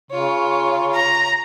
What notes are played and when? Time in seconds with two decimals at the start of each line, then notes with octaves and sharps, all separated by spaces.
0.11 C#3 F4 C#5
0.95 A#5